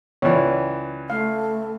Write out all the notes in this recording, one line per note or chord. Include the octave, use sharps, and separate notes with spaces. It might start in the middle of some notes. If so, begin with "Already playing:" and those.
C#2 E3 C#5 D5
A3 F5